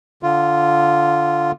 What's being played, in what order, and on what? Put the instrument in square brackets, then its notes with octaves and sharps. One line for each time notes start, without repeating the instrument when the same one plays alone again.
[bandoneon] D3 F4